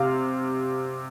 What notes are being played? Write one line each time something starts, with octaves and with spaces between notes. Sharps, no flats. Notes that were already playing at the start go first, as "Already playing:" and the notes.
Already playing: C3 F5